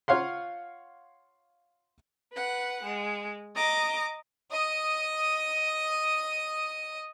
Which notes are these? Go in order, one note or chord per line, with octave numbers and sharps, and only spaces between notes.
F4 C#5 F5 F#5 C6
B4 F#5
G#3
D#5 A#5 D6
D#5 D#6